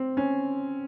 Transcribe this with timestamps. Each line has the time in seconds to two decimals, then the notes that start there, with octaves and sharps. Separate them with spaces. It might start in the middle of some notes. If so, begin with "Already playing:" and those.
Already playing: C4
0.17 C#4